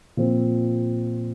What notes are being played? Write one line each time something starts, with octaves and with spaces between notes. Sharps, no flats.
A#2 F3 C4